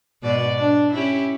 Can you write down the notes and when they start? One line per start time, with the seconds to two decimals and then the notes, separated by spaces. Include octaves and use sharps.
0.22 G#2 B2 D5
0.58 D4
0.94 C#4 E4 G4